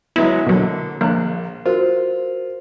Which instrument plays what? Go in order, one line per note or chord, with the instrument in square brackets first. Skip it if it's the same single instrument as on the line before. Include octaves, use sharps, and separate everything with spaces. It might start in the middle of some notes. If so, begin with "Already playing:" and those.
[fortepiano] F#3 G#3 B3 [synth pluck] E4
[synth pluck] B2 F#3 [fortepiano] D3 A#3
[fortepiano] A#1 F#6 [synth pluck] A#3
[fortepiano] F4 [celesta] F#4 A#4 C5